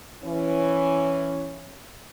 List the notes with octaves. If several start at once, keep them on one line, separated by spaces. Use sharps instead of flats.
E3 C#4